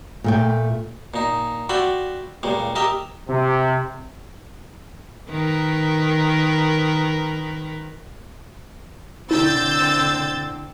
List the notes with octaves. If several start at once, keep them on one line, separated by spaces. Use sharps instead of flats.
A#2 A3 G5
A#2 D#4
F4 F#4 D5 E5 G5 B5
C#2 A#2 G3
G4 A#4 D#5 E5 G5
C3
D#3 A#4 B4
D3 C4 E4 E6 G6 A6